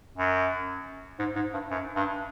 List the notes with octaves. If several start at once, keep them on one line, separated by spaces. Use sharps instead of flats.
F#2
G#2
G#2
G2
F#2
G2